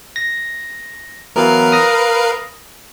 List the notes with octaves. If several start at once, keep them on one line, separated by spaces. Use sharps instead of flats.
A#6
E3 F#3 B3 A#4 B4 F5
D#6 A#6